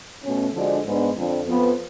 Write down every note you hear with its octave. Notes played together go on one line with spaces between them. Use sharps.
B2 A3 C#4
D3 F3 G#3 D4 F#4
G#2 G#3 B3 D4
F2 D3 F3
F2 F3 B3